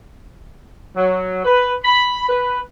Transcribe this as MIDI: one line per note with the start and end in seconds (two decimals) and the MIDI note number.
0.97 1.42 54
1.45 1.73 71
1.84 2.28 83
2.29 2.60 71